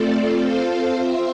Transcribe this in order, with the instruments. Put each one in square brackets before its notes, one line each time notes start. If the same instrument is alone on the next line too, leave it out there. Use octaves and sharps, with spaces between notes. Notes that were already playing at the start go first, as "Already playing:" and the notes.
Already playing: [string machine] A3 C4 F4 A4 D5
C4 F4 A4 C5 F5
C4 F4 C5 E5